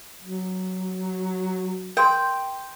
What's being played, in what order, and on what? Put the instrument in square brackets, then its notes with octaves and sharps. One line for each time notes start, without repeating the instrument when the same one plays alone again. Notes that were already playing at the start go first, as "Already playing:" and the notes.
[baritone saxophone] F#3
[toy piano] A#4 C6 [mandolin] G5